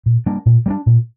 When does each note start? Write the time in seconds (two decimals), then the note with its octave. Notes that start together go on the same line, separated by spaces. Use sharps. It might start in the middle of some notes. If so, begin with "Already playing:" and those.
0.06 A#2
0.26 G3 A#3 D4
0.46 A#2
0.66 G3 A#3
0.70 D4
0.86 A#2